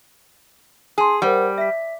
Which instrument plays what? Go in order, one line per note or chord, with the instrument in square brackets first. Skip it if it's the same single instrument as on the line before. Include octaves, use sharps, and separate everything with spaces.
[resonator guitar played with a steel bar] G#4 [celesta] A5 C6
[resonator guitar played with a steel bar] G3 [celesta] A#4 C5 F#5
[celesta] E5 B6